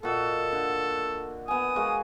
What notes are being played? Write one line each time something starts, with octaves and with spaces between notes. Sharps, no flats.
A#2 F#4 A4 D#5
D3
B3 G#5 D#6
G#3 A#3 F#4